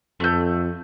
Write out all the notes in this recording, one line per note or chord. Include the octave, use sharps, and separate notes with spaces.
F2 A3 G6